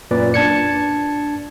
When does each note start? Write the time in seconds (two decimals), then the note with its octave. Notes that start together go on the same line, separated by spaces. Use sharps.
0.11 F#2 A#2 B4 D5
0.34 D4 A5 G#6 C#7